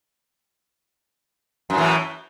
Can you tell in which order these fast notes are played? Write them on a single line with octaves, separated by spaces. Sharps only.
F#2 A2 E3